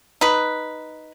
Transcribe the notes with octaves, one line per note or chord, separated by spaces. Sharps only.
D#4 B4